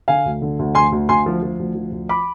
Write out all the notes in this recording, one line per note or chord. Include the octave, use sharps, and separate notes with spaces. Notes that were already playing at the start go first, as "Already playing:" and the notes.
D3 F5 G#5
D2
D3
D2
D2 G#5 C6
D2
D2 G#5 C6
F3
F3
D2
F3
D2
B5 D6